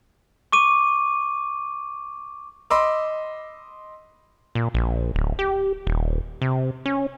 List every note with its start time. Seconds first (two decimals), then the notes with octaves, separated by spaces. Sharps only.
0.52 C#6 D6 D#7
2.70 D#5 B5 C6 D6 E6
4.55 A#2
4.74 A#1
5.15 D1
5.39 G4
5.87 D#1
6.42 C3
6.86 C#4